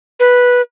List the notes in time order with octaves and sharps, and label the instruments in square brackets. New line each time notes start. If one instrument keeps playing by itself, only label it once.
[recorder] B4